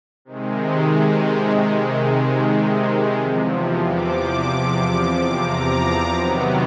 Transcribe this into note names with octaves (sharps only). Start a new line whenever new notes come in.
C3 D#3 G#3
E2 C3 F3
D6
A#5
C3 D#3 F#3 B3